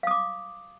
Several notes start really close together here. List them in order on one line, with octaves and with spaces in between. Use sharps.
F5 D#6 D6